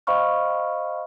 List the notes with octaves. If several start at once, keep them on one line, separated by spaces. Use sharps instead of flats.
C5 D#5 F5 B5 C#6 F6